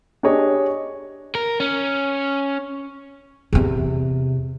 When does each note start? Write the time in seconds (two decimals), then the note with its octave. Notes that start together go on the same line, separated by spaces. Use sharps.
0.23 D4 G4 G#4 C#5 D#5
1.35 A#4
1.60 C#4
3.53 E2 C3